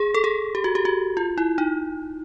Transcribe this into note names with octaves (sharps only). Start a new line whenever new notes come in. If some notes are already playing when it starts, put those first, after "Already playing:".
Already playing: G#4
A4
G#4
G4
F#4
G4
F#4
F4
E4
D#4